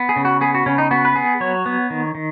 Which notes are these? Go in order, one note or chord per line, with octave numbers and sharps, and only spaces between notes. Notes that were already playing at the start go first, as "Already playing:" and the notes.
Already playing: B3
G#4
C#3
F#4
B3 G#4
F#4
C#3 C#4
D#4
B3 F#4
B4
B3 G#4
F#3 C#5
B3
D#3
D#3